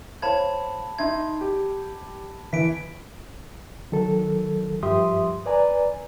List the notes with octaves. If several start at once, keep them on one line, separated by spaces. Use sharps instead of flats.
C5 C#5 F5 A5 B5 G#6
D#4 E5 C6 G#6
G4
E3 B6 D7
D#3 F#3 A4
G2 F3 G4 E5 C6 D#6
B4 D5 G#5 A#5